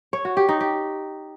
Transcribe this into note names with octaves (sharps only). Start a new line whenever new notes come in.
C#5
F#4
G4
D#4
G4